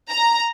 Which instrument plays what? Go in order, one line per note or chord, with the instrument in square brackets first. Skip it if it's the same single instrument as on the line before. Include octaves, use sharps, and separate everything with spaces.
[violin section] A#5